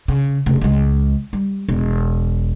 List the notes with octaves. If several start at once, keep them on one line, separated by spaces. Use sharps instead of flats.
C#3
F1 C#3
C#2 G#3
G3
E1